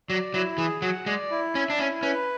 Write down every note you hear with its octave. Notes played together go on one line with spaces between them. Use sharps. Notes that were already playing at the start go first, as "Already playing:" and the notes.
F#3 D5
F#3 E4
E3 G#4
F#3 F#5
G#3 D5
E4
C#4 E5
D4
C#4 E4
C#4 B4